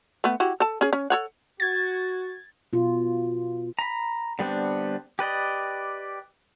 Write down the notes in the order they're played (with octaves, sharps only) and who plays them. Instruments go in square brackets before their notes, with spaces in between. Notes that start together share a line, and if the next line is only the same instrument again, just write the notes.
[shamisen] A3 B3
E4 F#4 G4
A4 A5
C#4 G#4
C#4
A4 C#5 F#5
[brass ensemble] F#4 [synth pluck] G#6 A6
[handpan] B2 F4
[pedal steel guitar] A#5 B5
D3 G3 B3 C4 D4
G4 B4 D5 D#5